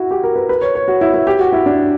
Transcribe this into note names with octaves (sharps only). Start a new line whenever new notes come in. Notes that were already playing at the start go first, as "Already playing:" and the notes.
Already playing: E4 F#4
G4
A#4
B4
B4
C#5
C#5
F#4
E4
E4
G4
F#4
E4
D4